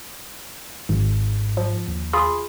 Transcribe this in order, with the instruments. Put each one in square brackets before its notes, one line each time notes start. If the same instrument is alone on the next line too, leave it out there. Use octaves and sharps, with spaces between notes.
[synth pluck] G#1 [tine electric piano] G#2
[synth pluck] F3
[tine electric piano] D#2
[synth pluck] F4 G#4 B5